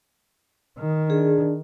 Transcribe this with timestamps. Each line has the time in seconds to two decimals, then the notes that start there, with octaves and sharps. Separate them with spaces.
0.79 D#3
1.10 D4 G#4